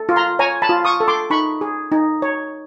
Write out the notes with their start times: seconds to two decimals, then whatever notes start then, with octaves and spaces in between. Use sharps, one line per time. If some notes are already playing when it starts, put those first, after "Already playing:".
Already playing: A4
0.09 F4
0.16 A#5 C6
0.39 C#5 G#5 A#5
0.62 A5 B5
0.69 F4
0.85 C#6 D#6
1.00 A4
1.08 C6 D6
1.30 D#4 B5 C#6
1.61 G#4
1.92 D#4
2.22 C#5